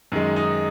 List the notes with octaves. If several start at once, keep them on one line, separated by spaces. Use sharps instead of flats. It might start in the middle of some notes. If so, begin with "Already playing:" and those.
F#2 D#3 G#3
D#4